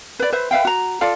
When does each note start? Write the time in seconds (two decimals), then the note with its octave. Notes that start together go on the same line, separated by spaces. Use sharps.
0.19 B4 D5
0.33 B4 C5 E5
0.51 B4 E5 F5 G5
0.65 F#4 A#5
1.01 F4 A4 D5 F5